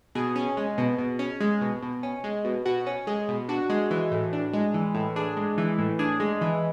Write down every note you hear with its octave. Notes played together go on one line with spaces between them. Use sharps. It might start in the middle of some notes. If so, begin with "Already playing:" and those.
B2 G#4
C#4
G#3
B2
B2
C#4
G#3
B2
B2
C#4
G#3
B2
B2 F#4
C#4
G#3 G#4
B2
D4 F#4
G#3
E3
A2
D4
G#3
E3
A2
D4 G#4
G#3
E3
A2
D4 G#4
G#3
E3